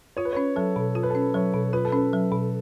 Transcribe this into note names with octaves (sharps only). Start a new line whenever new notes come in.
F4 C#5
B4
C#4 C#5
F#3 A4
B2
F4 A4
B4
C#4 A4
F#3 C#5
B2
F4 B4
A4
C#4 B4
F#3
B2